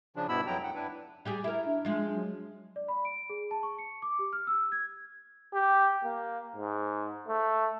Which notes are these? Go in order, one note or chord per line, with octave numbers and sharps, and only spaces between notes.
C#3 F3 D4
G2 B2 B3 E4 B5 E6
F2 F#3 E4 G5 A#5
F#2 F#5 G5
D4 E4 B4
G3 G4 G#4
E4 A#4
D4
F3 G#3
F#3
D5
B5
D7
G#4
A5
C#6
C#7
D6
G4
F6
E6
G#6
G4
A#3
G#2
A3